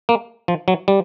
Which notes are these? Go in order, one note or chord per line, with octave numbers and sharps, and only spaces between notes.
A#3
F3
F#3
G3